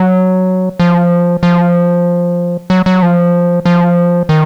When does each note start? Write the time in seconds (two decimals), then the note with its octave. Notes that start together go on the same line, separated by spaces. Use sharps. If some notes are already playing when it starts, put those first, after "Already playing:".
Already playing: F#3
0.80 F3
1.43 F3
2.70 F#3
2.86 F#3
3.02 F3
3.66 F3
4.29 D#3